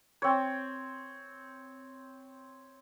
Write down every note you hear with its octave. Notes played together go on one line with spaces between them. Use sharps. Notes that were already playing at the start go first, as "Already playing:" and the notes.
C4 C#5